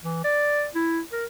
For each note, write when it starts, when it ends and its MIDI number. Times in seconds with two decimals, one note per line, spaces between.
0.04 0.24 52
0.24 0.67 74
0.75 1.01 64
1.12 1.25 70